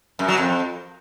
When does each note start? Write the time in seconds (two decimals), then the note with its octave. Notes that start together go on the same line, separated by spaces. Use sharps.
0.19 F#2
0.28 F#3
0.37 F2